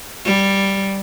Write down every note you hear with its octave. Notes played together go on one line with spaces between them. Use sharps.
G3